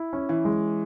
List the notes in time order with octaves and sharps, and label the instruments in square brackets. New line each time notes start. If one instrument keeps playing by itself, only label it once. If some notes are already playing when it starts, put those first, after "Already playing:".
Already playing: [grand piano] E4
C#4
[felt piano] E3
[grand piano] G#3